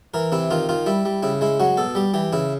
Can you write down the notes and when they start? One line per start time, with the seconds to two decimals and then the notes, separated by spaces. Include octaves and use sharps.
0.14 E3 A#4
0.32 C3 E4
0.51 D#3 F4
0.69 D#3 F4
0.86 G3 E4
1.05 G3
1.23 C#3 E4
1.41 G#3 E4
1.60 F#3 F#4
1.77 B2 A4
1.95 G3 G4
2.14 E3 G4
2.33 C#3 E4